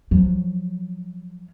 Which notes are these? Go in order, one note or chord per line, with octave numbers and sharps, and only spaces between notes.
F3 F#3